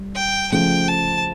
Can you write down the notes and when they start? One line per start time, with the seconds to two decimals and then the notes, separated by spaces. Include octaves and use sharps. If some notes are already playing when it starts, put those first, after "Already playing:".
Already playing: G3
0.15 G5
0.52 C#3 F3 A3 G5
0.88 A5